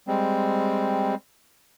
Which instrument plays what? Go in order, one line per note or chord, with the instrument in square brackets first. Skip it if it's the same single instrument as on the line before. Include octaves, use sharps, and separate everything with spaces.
[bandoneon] G3 G#3 C4